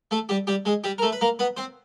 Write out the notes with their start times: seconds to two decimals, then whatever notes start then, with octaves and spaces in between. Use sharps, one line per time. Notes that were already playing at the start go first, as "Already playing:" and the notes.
0.11 A3 A4
0.29 G3 G4
0.47 G3 G4
0.65 G#3 G#4
0.84 G3 G4
0.98 A#4
1.02 A3 A4
1.12 B4
1.21 A#3 A#4
1.39 B3 B4
1.57 C4 C5